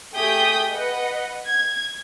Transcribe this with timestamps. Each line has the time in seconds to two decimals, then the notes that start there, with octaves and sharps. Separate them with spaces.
0.15 A3 G4 G#4 D#6 G6 B6
0.70 B4 D#5 F#5
1.48 G#6